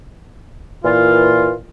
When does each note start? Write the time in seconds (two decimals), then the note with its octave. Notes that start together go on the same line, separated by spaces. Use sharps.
0.85 A#2 E3 F4